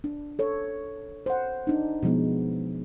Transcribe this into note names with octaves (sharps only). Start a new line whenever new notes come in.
D4
A4 C#5
C5 F#5
D4 D#4
B2 F3 G#3 B3